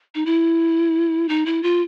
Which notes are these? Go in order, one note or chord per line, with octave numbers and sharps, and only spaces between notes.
D#4
E4
D#4
E4
F4